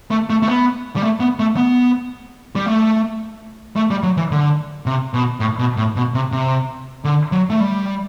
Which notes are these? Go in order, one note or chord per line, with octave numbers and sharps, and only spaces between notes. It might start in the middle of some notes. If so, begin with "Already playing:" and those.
A3
A3
A3
B3
G3
A3
B3
A3
B3
G3
A3
A3
G3
F#3
E3
D3
C3
B2
A2
B2
A2
B2
C3
C3
D3
F#3
A3
G3